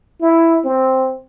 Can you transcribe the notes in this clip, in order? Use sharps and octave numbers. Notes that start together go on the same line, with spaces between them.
E4
C4